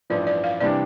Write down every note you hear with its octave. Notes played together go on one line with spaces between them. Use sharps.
A1 G2 F3 D5
D5
F5
C3 E3 G3 D4 D5